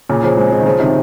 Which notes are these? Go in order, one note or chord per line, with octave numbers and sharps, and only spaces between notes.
A#2 C#3
C#3 F3
G#3 C4
G#3 C4
D#3
C#3 F3
C3 D#3